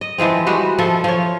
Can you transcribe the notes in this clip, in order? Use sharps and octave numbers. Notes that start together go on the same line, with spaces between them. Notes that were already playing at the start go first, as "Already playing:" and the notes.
D#5
E3 F3 G#3 C4
G3 G#3 F#4 B4
F3 A4 E5
F3 C#5